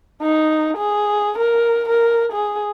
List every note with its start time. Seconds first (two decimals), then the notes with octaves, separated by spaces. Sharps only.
0.21 D#4
0.77 G#4
1.38 A#4
1.88 A#4
2.32 G#4